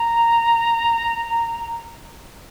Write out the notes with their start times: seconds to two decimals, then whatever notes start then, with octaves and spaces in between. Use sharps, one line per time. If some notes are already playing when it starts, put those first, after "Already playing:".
Already playing: A#5